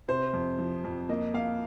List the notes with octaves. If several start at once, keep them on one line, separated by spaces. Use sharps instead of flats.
C3 C5
F2
F3
F2
A#3 D#5
A#3 F5